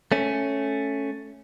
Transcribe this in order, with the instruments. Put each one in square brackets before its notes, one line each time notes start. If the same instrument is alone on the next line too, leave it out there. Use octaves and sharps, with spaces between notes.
[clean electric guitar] A3 C#4